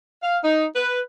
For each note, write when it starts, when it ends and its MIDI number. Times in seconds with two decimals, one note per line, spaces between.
0.22 0.37 77
0.43 0.65 63
0.76 1.01 71